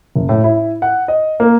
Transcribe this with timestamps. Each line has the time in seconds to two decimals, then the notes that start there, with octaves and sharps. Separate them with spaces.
0.16 F#1
0.29 A2
0.44 E4
0.82 F#5
1.08 D#5
1.40 A#3